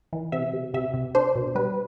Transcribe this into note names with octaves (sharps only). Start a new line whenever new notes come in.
E3
C3 E5
C3
C3 E5
C3
D4 C5
B2
G3 B4